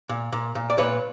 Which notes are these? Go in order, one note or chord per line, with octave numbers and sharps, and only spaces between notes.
A#2
A#2
A#2
D5
A#2 B4 C#5